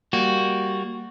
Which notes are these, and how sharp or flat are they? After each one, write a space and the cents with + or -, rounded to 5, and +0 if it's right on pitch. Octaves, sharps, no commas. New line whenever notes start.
G3 +0 A#3 +0 F#4 +0